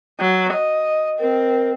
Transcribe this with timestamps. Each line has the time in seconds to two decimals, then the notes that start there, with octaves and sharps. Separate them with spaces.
0.20 F#3
0.54 D#5
1.20 C4 A#4